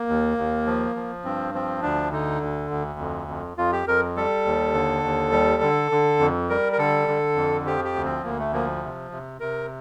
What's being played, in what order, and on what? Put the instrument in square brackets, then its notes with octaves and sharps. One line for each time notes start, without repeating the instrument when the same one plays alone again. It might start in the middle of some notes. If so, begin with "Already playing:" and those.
Already playing: [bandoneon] A#3
D#2
D#2
F3
F3
G2 C4
F3 C4
D2 D4
D3 D#4
D2
D2
F2
F2
F2 F4
G4
F2 A#4
G3 A4
D#2
D3
D#2
G3
D3
D3
F2
G3 A#4
A#4
D3 A4
D3
F2
F3 G4
G4
D2
C4
D2 A#3
A3
F3 A#3
C3
C3
C3 A#4